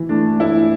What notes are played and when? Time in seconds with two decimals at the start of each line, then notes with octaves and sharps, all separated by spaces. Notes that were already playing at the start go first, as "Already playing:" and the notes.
Already playing: E3
0.09 A3 D4
0.39 A3 E4